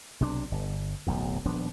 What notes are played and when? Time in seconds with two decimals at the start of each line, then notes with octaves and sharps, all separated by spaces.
0.20 B1 C3 D4
0.52 G1
1.07 D1 B1 E2
1.45 D#1 F3 B3 D4